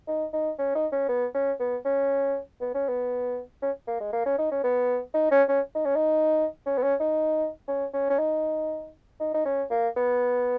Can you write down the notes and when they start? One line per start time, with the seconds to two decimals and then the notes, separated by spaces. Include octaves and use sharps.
0.08 D#4
0.33 D#4
0.59 C#4
0.75 D#4
0.92 C#4
1.09 B3
1.34 C#4
1.60 B3
1.85 C#4
2.61 B3
2.74 C#4
2.89 B3
3.62 C#4
3.88 A#3
4.00 G#3
4.13 A#3
4.26 C#4
4.38 D#4
4.52 C#4
4.64 B3
5.14 D#4
5.32 C#4
5.49 C#4
5.75 D#4
5.85 C#4
5.95 D#4
6.66 C#4
6.78 B3
6.83 C#4
7.00 D#4
7.68 C#4
7.94 C#4
8.10 C#4
8.19 D#4
9.20 D#4
9.34 D#4
9.45 C#4
9.71 A#3
9.97 B3